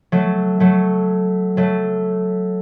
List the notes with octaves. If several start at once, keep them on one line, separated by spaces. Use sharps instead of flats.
F#3 A3
F#3 A3
F#3 A3